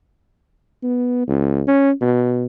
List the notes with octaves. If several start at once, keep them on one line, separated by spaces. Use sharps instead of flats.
B3
C#2
C#4
B2